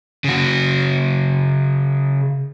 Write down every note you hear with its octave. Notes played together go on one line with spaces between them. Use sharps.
C#3 F#4